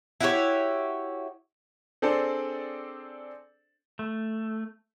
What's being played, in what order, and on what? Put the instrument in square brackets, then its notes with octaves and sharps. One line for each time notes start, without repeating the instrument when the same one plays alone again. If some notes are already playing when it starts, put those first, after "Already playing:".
[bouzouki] E4 F#4 G4 C#5
[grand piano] C4 D4 G#4 A4 C5 D5
[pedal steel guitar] A3